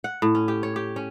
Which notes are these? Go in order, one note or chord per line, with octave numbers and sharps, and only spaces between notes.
F#5
A2
C#4
G4
C#5
G4
C#4